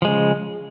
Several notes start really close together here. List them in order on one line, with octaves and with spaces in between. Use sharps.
F3 G#3 C#3